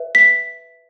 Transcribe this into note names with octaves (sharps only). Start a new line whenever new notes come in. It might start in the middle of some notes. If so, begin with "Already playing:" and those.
Already playing: B4 E5
B6